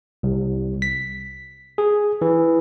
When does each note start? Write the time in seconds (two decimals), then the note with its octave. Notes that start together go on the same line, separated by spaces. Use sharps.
0.23 C2
0.82 B6
1.78 G#4
2.22 E3